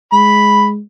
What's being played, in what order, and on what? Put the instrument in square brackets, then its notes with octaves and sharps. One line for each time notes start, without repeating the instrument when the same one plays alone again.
[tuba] G#3 [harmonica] B5